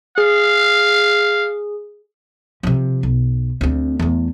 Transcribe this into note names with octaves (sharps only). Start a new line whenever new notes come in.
G#4 F5
C3 F3
B1
D2 C4
E2 A3